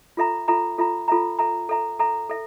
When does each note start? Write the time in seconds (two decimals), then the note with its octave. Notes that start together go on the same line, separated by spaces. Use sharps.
0.17 F4 A4 E5 A#5
0.48 F4 A4 E5 A#5
0.78 F4 A4 E5 A#5
1.08 F4 A4 E5 A#5
1.39 A4 E5 A#5
1.69 A4 E5 A#5
1.99 A4 E5 A#5
2.29 A4 E5